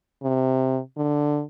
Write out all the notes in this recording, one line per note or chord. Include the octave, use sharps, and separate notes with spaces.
C3
D3